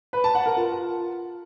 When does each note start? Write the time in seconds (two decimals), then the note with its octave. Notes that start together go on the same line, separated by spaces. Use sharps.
0.13 B4
0.24 A5
0.35 F#5
0.46 A#4
0.57 F4